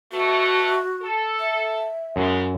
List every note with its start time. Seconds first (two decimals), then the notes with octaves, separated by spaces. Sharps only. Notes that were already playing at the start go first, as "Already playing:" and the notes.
0.12 B2 A3 F#4
1.01 A4
1.39 E5
2.16 F#2 C#3 G#3